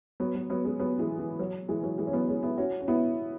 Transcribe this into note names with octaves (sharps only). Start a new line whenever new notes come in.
F#3 B3
F#3
F#3 B3
G#3 C#4
F#3 B3
E3 G#3
E3
F#3
E3 G#3
F#3
E3 G#3
C#4
F#3 B3
G#3 C#4
B3 E4
C#4 F#4
C#4
B3 E4